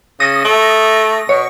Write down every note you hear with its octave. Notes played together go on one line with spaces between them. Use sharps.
C#3 D#6 A#6
A3
B2 C#5